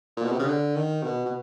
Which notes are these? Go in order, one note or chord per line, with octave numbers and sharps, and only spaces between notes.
A#2
B2
C3
C#3
D3
D#3
B2
B2